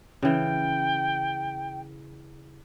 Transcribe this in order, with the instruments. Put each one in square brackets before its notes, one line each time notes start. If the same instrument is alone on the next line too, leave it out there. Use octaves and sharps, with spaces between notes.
[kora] C#3 E3 [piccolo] G5